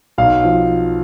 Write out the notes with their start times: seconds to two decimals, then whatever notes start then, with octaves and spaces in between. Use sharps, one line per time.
0.18 B1 F5
0.44 F3